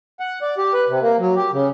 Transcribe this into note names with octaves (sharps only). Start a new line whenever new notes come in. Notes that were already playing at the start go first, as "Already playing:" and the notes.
F#5
D5
G4
B4
C3
A#3
F#3
G4
C#3